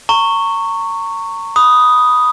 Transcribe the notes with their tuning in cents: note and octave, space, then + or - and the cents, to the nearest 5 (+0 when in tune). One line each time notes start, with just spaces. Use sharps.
A#5 -35 C#6 +0
B5 -5 D#6 +0